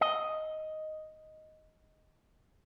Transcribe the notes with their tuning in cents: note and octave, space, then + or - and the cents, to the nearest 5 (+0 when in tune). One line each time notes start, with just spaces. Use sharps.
D#5 +5